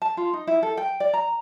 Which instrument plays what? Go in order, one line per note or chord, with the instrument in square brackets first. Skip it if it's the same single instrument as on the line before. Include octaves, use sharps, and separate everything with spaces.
[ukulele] A5
F4
D#4
E4
A4
G5
D5
A#5